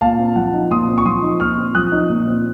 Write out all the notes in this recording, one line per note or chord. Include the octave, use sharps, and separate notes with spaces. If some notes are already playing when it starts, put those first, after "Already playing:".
A#2 F5 A5
C4
F3 F#5
D#4
A#2 C6 D#6
C4
C#6
F3 C6 D#6
D#4
A#2 C#6 F6
C4
F3 D#6 F#6
D#4
A#2
C4